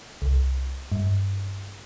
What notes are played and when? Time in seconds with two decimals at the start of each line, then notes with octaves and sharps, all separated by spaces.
0.22 C2
0.92 G2